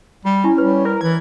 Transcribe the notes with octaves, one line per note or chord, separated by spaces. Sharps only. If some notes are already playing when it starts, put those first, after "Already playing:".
G3 F#4
C#4 E4
G3 B4
A#4
E3 G#6